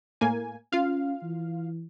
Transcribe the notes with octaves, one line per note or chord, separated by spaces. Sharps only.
A2 A#3 G#5
C#4 F4 F5
E3